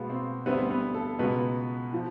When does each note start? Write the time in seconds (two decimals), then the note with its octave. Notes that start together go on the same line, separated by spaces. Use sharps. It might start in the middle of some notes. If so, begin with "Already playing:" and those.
Already playing: B2 G#3 A#3 B3
0.09 C4 C5
0.46 D2 D3 G3 B3 C4 B4
0.70 B3 B4
0.94 A4
1.19 C#2 B2 G#3 B3 B4
1.91 A2 F3